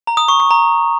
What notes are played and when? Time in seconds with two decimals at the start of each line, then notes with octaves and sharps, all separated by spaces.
0.07 A#5
0.17 D#6
0.28 C#6
0.40 C#6
0.51 A#5